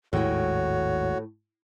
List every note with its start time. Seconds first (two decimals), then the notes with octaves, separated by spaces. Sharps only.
0.13 G#1 D#2 A2 G#3 F#4 C#5 G5